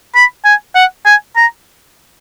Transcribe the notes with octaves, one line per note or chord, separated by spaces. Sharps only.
B5
G#5
F#5
G#5
A#5